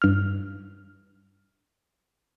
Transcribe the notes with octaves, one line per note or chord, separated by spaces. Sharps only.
G2 F6